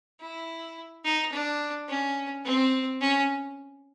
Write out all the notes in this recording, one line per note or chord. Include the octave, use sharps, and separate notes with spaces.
E4
D#4
D4
C#4
C4
C#4